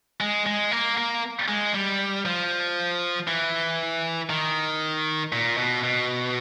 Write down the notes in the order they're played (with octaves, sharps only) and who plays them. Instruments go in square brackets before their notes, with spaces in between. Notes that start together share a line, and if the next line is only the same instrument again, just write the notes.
[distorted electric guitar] G#3
G#3
A#3
A#3
G#3
G3
F3
E3
D#3
A#2
B2
B2